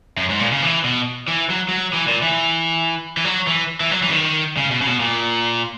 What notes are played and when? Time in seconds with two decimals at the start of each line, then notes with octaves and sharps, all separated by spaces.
0.17 F#2
0.29 G#2
0.40 A#2
0.51 C#3
0.62 E3
0.84 B2
1.28 E3
1.50 F#3
1.69 F#3
1.93 E3
2.07 A#2
2.22 E3
3.17 E3
3.24 F#3
3.47 E3
3.80 E3
3.91 F#3
4.02 E3
4.09 C#3
4.12 D#3
4.57 C#3
4.71 B2
4.81 C#3
4.87 B2
5.00 A#2